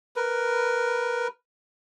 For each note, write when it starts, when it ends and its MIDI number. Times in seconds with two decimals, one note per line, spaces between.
0.16 1.27 70
0.16 1.27 71